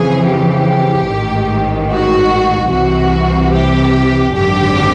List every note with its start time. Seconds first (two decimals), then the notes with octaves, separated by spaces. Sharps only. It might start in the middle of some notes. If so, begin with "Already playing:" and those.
Already playing: F2 C#3 E3 G#4
0.28 G4
1.08 A1 G#2 D#3
1.90 F#4
2.71 C2 C3 E3 F#4
3.52 G4
4.34 G#1 F#2 D3 G4